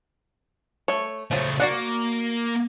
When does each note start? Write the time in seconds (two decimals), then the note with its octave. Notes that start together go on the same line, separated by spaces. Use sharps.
0.88 A3 C#5
1.31 C#3 F3 F#3 A3
1.60 A#3 F#4 D5 F#5